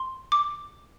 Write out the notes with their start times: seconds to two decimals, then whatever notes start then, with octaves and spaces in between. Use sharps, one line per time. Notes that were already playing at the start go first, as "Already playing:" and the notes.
Already playing: C6
0.32 D6